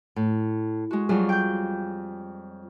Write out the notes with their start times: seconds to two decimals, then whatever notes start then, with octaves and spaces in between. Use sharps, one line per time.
0.16 A2
0.91 G#3 F#4
1.09 F2 F#3 G3 F4 G#4
1.29 G5 G6